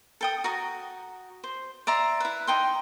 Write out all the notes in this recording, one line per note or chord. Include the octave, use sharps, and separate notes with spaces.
A4 G5 D#6
F#4 A#5 D#6
C5
D5 E5 A#5 C6
E4 B4
D#4 G5 C6